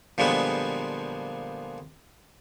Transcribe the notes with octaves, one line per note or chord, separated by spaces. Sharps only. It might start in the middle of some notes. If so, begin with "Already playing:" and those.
A#2 D3 F3 G3 G#3 B3